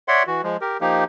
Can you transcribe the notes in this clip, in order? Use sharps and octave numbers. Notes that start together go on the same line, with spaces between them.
C#5 D5 E5 F#5 C6
E3 F#4
F3 G#3
G4 A#4
F3 A#3 D#4 G4